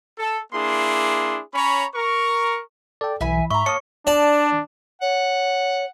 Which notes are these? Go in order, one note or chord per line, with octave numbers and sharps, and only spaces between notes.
A4
A#3 D4 E4 G#4 C6
C#4 C#5 A#5 B5
A#4 C#6
A4 D5 G5
B1 E3 E5 G#5 B5
G#2 E5 A#5 B5 C#6
A#3 C#5 A5 D#6 C#7
D4 D5 A5
C#5 F#5